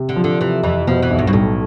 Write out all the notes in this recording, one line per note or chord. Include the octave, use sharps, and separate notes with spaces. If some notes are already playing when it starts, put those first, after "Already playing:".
Already playing: C3
D3
F3
D3
C3 E3
F2 E3
B2 F3
E3
B1
G2
B2
B1 A2